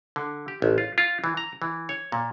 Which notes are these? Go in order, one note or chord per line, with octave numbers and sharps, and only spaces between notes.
D3
G4
A1
F4
F4
E3
A#5
E3
C#5
A#2